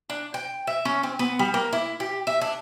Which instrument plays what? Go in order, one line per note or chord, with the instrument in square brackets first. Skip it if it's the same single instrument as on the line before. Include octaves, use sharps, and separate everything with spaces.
[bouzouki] D4
G5
E5
C#4
C4
B3
G3
A#3
E4
G4
E5
D4